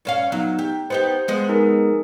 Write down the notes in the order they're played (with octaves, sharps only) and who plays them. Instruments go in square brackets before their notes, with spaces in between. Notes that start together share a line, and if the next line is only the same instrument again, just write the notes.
[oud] G2 C#4 F5
[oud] F#3 [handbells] B3 D#4
[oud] G4
[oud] B3 D#4 G4 [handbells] C5
[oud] F3 G#3 B3
[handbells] D#4 G#4 A#4